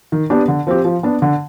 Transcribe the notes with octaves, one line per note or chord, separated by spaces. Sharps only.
D#3
B3 D4 G4
D3
F3 C4 G4
F3
B3 D4
D3